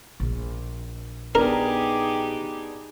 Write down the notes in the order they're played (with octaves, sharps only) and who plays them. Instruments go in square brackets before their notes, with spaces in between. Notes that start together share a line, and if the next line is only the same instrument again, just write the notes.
[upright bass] A#1
[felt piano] B3 D4 [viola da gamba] D#4 G4 G#4 [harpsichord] A#4